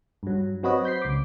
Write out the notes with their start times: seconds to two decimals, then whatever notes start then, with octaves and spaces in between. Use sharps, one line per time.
0.23 G2 F#3
0.63 F#3 C4 F#4 B4 C#5 D#5
0.84 C5 G6 B6 C7
1.02 C#2 D6